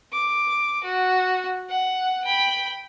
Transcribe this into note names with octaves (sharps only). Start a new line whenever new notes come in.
D6
F#4
F#5
G5 B5